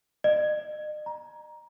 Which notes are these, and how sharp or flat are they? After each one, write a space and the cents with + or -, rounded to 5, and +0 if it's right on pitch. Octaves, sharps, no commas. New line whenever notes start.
D#5 -45
A#5 +15